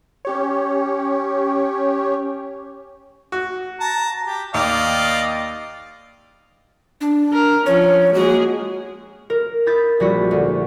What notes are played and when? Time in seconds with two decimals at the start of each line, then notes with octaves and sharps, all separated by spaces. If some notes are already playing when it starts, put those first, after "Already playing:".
0.25 C#4 G4 C#5
3.32 F#4
3.80 A5 A#5
4.27 G4
4.54 D#2 D5 D#5 F5
7.01 D4
7.33 A#4
7.66 F3 C#4 C#5
8.14 G#3 A#3 F#4 G#4
9.30 A#4
9.66 E4 D#6 G6 A6 B6
10.00 A#1 G3 E4 F#4 B6
10.31 D2